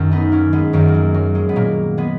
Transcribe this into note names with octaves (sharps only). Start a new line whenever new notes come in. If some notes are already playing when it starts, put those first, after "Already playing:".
Already playing: F#2 D#3 C#4
B3 D#4
A#3 C#4
G#3 B3
F#2 D#3 F#3 A#3
A#3
G#3
F#3
G#3
B3
A#2 F#3 A#3
G#3 B3